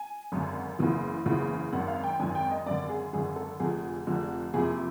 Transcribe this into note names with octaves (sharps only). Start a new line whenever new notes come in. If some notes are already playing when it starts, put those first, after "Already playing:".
Already playing: G#5
G#1 F#2 D3
F#1 E2 C#3 E3
F#1 E2 C#3 E3
G#1 F#2 D#3 F#5
F5
G5
G#1 F#2 D#3 G#5
G5
D#5
G#1 F#2 D3 D5
G#4
G#1 F#2 D3 G#4
A4
F1 F2 D3 G#4
F1 F2 D3
F#1 F2 C3 G#4